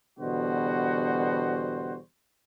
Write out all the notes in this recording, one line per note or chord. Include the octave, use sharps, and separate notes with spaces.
E2 B2 D3 G3 F#4 C5